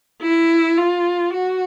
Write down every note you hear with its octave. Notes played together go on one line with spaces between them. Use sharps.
E4
F4
F#4